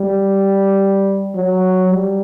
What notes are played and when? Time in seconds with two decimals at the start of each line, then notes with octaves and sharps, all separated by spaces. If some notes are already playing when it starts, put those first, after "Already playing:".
Already playing: G3
1.36 F#3
1.91 G3